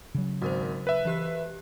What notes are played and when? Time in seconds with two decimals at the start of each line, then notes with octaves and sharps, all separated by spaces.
0.15 C#3 F#3
0.42 G#1 F#4 A#4 C5
0.87 B4 E5
1.05 E3 G4 F#6